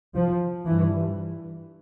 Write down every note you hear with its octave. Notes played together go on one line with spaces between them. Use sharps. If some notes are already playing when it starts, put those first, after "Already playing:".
F3
G2 E3